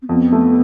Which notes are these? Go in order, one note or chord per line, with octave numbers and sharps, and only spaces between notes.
C4
F2 B3
A3